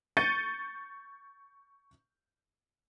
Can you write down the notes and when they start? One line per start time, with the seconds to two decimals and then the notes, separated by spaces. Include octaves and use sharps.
0.17 C#6 G6 A6 C#7 D#7